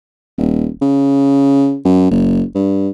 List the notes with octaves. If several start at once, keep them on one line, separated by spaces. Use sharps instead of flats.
D#1
C#3
F#2
F#1
G2